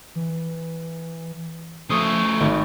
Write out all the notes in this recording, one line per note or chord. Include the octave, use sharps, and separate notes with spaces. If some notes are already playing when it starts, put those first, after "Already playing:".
E3
C#3 F3 A3 C#6 D#6 C7
G#1 C#6